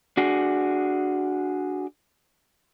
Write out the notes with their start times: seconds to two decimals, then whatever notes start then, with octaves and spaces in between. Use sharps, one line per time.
0.17 D4 F#4 G#4